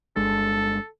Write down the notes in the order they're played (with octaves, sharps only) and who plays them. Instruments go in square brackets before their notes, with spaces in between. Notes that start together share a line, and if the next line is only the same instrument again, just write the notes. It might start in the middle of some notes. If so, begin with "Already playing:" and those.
[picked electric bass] G1 G#3 D4 [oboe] A4